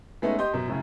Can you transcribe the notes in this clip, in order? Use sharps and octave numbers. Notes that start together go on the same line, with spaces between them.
G#3 A3 B3 C#4 D#4
G4 D#5 C6 G6
F#2 B2
F#2 A2 C#3